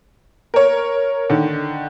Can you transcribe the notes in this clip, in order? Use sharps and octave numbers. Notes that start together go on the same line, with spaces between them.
A#4 C#5
D3 D#3